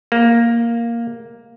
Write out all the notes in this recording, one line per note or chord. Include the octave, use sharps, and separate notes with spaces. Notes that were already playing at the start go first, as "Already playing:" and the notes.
A#3